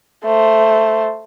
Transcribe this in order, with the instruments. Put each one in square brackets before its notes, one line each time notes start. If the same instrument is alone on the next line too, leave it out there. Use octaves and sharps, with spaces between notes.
[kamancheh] A3 C5